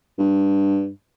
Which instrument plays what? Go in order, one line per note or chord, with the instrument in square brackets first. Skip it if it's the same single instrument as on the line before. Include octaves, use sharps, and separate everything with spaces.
[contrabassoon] G2